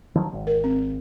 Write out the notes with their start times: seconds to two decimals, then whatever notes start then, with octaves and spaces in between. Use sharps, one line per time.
0.15 D#3 F3 F#3
0.33 G#1
0.47 A#4
0.64 C4